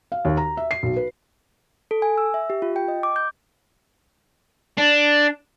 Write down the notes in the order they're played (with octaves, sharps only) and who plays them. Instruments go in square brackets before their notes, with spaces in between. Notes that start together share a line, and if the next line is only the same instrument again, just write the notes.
[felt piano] F5
D#2
A#5
E5
C7
B1
B4
[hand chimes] A4
G#5
E6
E5
G4
F4
G5
D#5
D6
G6
[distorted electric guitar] D4